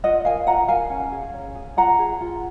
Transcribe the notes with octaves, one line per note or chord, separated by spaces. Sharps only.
F4 D#5 F#5
A#4 F5 G#5
F4 F#5 A#5
A#4 F5 G#5
C#4
G#4
C#4
G#4
F4 F#5 A#5
G#4
F4